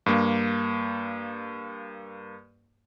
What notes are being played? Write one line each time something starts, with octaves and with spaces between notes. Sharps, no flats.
G2 A#3